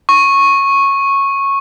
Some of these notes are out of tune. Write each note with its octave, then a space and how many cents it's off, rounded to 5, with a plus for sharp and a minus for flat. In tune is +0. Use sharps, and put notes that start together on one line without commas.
C#6 -10